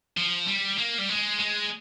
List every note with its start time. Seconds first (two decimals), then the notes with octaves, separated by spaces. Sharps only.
0.17 F3
0.47 G3
0.78 A#3
0.98 G3
1.10 G#3
1.40 G#3